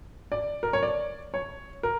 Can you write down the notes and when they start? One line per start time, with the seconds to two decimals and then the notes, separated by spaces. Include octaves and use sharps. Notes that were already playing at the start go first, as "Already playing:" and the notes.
0.32 D5
0.63 A#4
0.73 C#5
0.83 D5
1.34 C#5
1.83 A#4